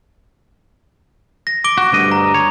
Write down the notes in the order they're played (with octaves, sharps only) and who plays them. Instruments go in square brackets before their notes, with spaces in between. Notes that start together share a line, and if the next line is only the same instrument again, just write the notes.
[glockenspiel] A#6
D6 D7 G7
[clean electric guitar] F#4
D2 G2 D#5
[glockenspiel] A#5
[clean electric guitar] C#5